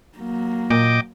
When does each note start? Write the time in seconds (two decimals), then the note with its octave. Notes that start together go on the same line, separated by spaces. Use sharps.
0.18 F#3 A#3
0.70 A#2 D#5 G5 D6